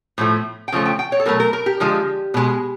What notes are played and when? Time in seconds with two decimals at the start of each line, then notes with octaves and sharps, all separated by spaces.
0.18 A2 F3 A3
0.68 G5
0.72 C#3 F3 A3
0.85 G5
0.99 G5
1.12 C#5
1.20 A4
1.26 B2 F#3 A3 A#4
1.40 A#4
1.53 A#4
1.66 G4
1.80 D3 F3 G#3
2.34 B2 G#3